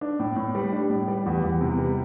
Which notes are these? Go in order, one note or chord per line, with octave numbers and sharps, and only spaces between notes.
D4
A2
A2
G3
D4
A2
G3
E2
E2
C3
G3